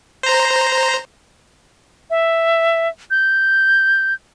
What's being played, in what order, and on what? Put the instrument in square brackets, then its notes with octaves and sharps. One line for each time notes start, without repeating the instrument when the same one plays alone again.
[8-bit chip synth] C5 A#5
[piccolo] E5
G6